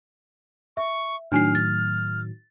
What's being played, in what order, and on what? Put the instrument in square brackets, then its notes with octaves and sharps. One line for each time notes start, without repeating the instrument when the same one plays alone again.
[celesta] E5 [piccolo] C#6
[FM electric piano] A2 D#3 F#3 [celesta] D4 G#5 C7 [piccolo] F6
[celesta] A6